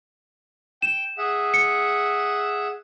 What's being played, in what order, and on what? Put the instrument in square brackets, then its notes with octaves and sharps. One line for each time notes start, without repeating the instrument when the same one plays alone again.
[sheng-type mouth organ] G5 [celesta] E7
[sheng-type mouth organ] G#4 E5 F#5
[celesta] C#7